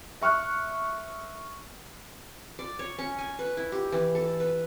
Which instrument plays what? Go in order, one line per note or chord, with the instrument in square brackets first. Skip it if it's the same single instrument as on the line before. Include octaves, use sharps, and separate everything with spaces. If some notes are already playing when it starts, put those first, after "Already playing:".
[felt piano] E5 C#6 F6 F#6
[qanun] D5
C#5
C#4
G#5
B4
E4
G4
E3
A4
B4